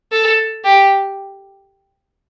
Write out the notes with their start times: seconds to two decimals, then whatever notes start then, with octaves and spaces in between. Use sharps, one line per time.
0.12 A4
0.65 G4